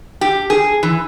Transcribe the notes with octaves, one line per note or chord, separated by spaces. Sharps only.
G4
G#4
E3